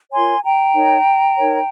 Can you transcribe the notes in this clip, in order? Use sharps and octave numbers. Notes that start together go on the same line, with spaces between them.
F4 A#4 C#5 G#5 C6
G5 A#5
D#4 A#4 C#5
D#4 A#4 C#5